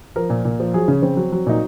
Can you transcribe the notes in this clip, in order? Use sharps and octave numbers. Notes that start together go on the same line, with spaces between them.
F3 A#4
A#2
A#2
F3
F#3 G#4
C#3 C#4
C#3 C4
F#3
F#3
A#2 D#4